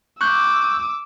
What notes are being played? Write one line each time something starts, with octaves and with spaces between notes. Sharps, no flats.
C#6 D6 E6 F#6 G6